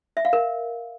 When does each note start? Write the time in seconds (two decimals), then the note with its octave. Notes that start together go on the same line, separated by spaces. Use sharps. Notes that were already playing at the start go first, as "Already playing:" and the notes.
0.17 E5
0.25 F5
0.33 A#4